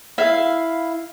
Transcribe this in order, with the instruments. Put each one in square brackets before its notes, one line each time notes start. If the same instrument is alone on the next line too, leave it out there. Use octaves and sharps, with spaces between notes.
[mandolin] E4 F5